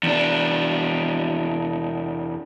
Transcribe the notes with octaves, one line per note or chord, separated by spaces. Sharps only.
E2 D4